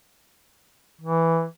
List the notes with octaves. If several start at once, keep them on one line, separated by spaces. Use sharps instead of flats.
E3